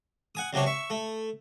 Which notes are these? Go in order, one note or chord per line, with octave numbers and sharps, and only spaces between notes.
F#5 G#5 D#6
C#2 C3 F#3 D4 C#5
E5 C#6
A3